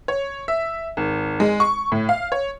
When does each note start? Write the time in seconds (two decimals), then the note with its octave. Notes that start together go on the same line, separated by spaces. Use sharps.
0.08 C#5
0.48 E5
0.97 G#1
1.40 G#3
1.60 C#6
1.92 A2
2.09 F5
2.32 C#5